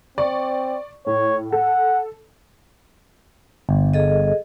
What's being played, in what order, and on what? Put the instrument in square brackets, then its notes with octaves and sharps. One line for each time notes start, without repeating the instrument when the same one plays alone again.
[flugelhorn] C4 [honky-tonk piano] D5 C#6
[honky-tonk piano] A2 [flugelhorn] C#5
[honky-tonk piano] A4 [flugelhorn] F#5
[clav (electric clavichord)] G1
[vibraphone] G#4 A4 D#5